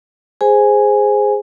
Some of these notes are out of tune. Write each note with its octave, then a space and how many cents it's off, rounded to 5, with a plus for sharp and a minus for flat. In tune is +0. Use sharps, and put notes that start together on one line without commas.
G#4 -5 C5 +0 G#5 +0